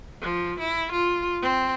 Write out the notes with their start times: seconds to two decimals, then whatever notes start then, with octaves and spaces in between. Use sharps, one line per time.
0.21 F3
0.60 E4
0.92 F4
1.42 C4